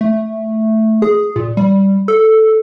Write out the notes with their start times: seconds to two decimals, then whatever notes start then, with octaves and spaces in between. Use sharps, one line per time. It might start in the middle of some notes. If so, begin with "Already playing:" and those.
0.01 A3
1.02 G#4
1.36 A#2
1.57 G3
2.08 A4